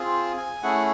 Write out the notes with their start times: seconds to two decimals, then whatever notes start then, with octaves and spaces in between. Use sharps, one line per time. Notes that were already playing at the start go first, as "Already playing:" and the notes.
Already playing: C4 F4 G#4
0.37 G#5
0.63 A3 C#4 E4 G#4 F#5